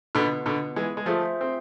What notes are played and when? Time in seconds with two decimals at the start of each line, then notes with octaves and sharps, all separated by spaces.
0.15 B2 D3 B3 F4 B4
0.46 B2 D3
0.76 E3 G#3
0.97 G#3
1.06 F3 A3 F4 G#4 C5 E5
1.41 C4